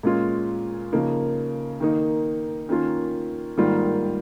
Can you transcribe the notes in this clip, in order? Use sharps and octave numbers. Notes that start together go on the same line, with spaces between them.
A#2 G#3 C#4 F4
C#3 F3 A#3 D#4
D#3 A#3 D#4
D#3 A#3 C#4 F4
G#2 D#3 G3 A#3 F4